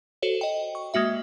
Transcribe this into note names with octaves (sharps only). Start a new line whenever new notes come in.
F#4 A4 C5 C#5
D#5 G5
C#6
G#3 A#3 F#4 E5